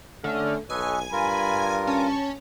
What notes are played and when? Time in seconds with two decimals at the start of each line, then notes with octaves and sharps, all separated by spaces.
0.24 D3 A3 C#4 F6
0.70 B1 A4 B4 C#5 D#5 G#5
1.13 G2 F4 A#4 B5
1.87 C#4 A5